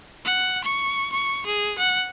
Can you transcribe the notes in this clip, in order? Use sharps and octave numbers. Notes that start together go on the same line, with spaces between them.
F#5
C#6
C#6
G#4
F#5